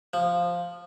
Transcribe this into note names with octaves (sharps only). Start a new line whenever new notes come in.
F3